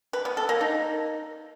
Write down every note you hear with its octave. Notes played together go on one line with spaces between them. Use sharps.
B4
B3
A4
A#3
D#4